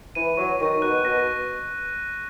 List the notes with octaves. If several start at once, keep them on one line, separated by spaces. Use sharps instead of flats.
E3 D#7
F#3 C#6
D#3 C#6
B2 F#6
B2 A#6